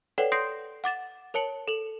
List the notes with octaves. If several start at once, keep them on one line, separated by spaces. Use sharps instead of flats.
A4 B4 C#5 D5 F#5 G5
C6 D#6 G6 A#6 C7 D7
F#5 D6 A6 E7
A#4 C#5 A5 C#7 F#7
A4 F7 F#7